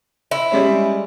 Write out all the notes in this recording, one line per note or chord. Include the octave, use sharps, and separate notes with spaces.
E4
G3 G#3 C#4